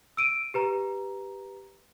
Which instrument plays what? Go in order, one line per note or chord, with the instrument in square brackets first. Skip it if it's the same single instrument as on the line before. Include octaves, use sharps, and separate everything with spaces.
[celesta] E6 D7 D#7
G4 B4 A#5